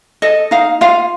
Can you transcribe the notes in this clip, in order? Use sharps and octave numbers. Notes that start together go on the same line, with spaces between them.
A4 D#5
D#4 F5
F4 F5